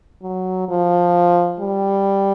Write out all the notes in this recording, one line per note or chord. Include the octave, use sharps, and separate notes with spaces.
F#3
F3
G3